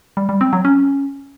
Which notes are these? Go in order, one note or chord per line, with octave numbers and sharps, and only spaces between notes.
G3
G3
C4
F#3
C#4